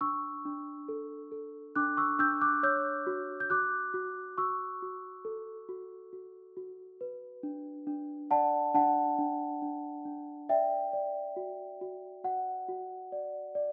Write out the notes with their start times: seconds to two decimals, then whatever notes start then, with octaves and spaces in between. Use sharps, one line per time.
0.01 D4 C#6 E6
0.45 D4
0.88 A4
1.32 A4
1.76 D4 D6 F#6
1.97 C#6 E6
2.19 D4 E6 G6
2.41 D6 F#6
2.63 C#5 E6 G6
3.07 F#4
3.40 G6
3.50 F#4 D6 F#6
3.94 F#4
4.38 F#4 C#6 E6
4.82 F#4
5.25 A4
5.69 F#4
6.13 F#4
6.57 F#4
7.01 B4
7.43 D4
7.87 D4
8.31 D5 F#5 A5
8.74 D4 F#5 A5
9.19 D4
9.62 D4
10.05 D4
10.49 D5 E5 G5
10.93 D5
11.36 F#4
11.81 F#4
12.24 F#4 F#5
12.68 F#4
13.12 D5
13.55 D5